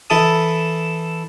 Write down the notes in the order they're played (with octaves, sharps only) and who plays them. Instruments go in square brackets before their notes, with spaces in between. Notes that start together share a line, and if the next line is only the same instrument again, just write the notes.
[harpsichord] E3 E4 A4 A5 D#6